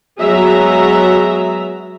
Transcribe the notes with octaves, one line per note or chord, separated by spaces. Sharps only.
F#3 G#3 B3 G#4 E5 A#5